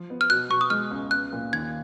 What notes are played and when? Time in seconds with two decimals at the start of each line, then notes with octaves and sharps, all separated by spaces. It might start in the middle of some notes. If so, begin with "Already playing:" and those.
Already playing: F3
0.10 B3
0.21 F6
0.30 B2 F#6
0.50 B2 C#6
0.61 D#6
0.70 G#3 F6
0.91 C#2
1.11 B3 F#6
1.33 A#2
1.53 D#2 G#6